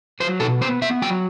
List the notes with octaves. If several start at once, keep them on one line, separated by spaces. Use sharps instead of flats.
F#3 C5
B2 A4
B3 C5
B3 E5
F#3 G5